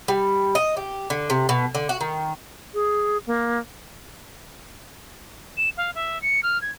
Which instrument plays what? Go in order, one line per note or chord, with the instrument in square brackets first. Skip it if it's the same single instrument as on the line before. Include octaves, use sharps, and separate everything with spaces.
[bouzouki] G3
D#5
G4
D3
C3
B2
D3
F#4
D#3
[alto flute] G#4
A#3
[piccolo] E7
F5
E5
C#7
F6
G#6